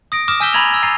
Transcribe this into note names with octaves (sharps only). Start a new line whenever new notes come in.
D#6 A#6 D7
D6 D#6 F6 E7
G#5 E6 G6 B6 E7 G7
G#5 A#5 B5 G#6 A#6 F7
E6 G#6
G#5 A#5 A6 C7